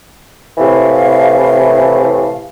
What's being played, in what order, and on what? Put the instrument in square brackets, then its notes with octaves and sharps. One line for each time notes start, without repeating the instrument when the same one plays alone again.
[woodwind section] A2 C3 E3 F5